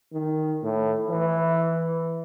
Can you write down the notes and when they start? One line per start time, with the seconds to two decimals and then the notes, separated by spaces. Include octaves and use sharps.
0.12 D#3
0.63 A2
1.10 E3